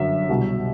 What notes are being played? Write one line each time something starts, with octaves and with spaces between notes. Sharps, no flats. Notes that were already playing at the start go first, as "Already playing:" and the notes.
Already playing: G1 F#2 D3 F#3 E5
C2 B2 F#3